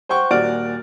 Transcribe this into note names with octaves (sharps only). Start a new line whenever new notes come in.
C5 F#5 G5 C#6
D#1 A#2 F#4 D5 F6 D7